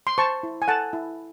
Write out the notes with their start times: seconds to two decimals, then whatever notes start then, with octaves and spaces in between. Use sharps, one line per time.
0.07 C6
0.18 C5 A5 C#6
0.43 E4
0.62 G#5
0.68 A4 F#5 A5
0.93 E4